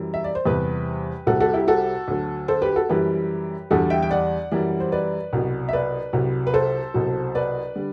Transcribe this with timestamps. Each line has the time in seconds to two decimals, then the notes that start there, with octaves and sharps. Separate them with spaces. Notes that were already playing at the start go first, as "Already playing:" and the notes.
Already playing: F#2 E3 G3
0.14 E5
0.24 D5
0.35 C5
0.45 E2 C3 G3 G4 B4
1.27 C2 C3 G3 F#4 A4
1.40 F#4 A4
1.54 E4 G4
1.68 F#4 A4
2.08 D2 D3 F#3
2.48 A4 C5
2.62 G4 B4
2.76 F#4 A4
2.89 F#2 E3 G3 G4 B4
3.70 E2 D3 G3 F#4 A4
3.90 E5 G5
4.03 G5
4.11 D5 F#5
4.52 F#2 E3 G3
4.80 C5
4.92 B4 D5
5.33 C2 B2 F#3
5.69 E5
5.73 B4 D5
6.13 C2 C3 F#3
6.47 B4
6.54 A4 C5
6.94 C2 B2 F#3
7.35 B4 D5
7.76 D3 G3